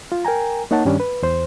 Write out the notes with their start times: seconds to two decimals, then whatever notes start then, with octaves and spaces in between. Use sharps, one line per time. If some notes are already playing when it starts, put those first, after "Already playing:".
0.12 F4
0.25 A#4 G5 G#5 A#5
0.71 A#3 D#4 C#5 F#5 A5
0.85 G2 D#3 G3 C#4 D4
1.00 B4
1.23 E2 C5